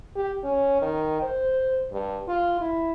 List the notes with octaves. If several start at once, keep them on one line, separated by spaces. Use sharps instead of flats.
G4
C#4
D#3
C5
G2
F4
E4